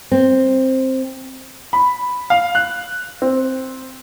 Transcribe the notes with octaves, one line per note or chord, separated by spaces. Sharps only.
C4
B5
F5
F#6
C4